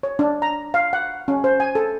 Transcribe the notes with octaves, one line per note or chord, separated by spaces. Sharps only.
C#5
D4
A#5
F5
F#5
C#4
C5
G#5
A4